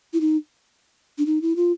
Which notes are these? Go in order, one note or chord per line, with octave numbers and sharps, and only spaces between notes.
E4
D#4
D4
D#4
E4
F4